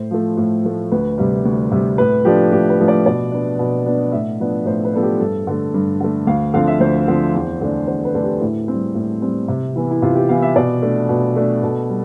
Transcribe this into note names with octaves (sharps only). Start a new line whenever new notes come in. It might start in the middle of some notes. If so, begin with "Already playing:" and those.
Already playing: A2 C5
F3 A3
A2
F3 A3
D2 B4
C3 G3
D2
C3 G3
A2 B4
F3 A3 D4 G4
A2 G4
B4
F3 A3 D4
D5
B2 D5
B3 D4
B2
B3 D4
A2 E5
F3 B3 D4
A2 C5
B4
F3 B3 D4 A4
G4
G2 A4
D3 A3
G2
D3 A3
D2 F5
D3 F3 C4 F5
E5
D2 C5
D3 F3 C4
E2
D3 A3 D4
E2 C5
B4
D3 A3 D4 A4
G4
A2 E4
C4
G3
A2
G3 C4
C3
E3 B3
E4
C3 F4
G4
E3 B3 F5
E5
B2 D5
A3 D4
B2
A3 D4
B2 A4
G3